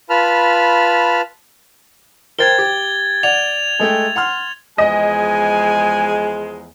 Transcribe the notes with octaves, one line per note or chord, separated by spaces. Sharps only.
F4 B4 A5 B5 F6
A#4 C5 G5 G#6 A6 G7
G4
D5 F#5 F7
G#3 A3 G5
F#5 C6 F6
E2 F3 G#3 D#5 G#5